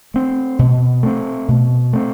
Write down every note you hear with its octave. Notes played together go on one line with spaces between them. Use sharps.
A3 C4
B2
A3 C4
B2
A3 C4